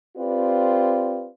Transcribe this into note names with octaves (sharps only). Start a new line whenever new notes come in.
C4 F4 G4 B4 D5